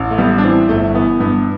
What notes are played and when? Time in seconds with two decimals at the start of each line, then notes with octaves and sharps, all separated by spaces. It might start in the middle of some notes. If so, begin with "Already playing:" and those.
Already playing: A1
0.11 A3
0.18 G3 B3
0.38 D4
0.44 E3 C4
0.69 G1 A3
0.94 E3 B3
1.20 G2 B3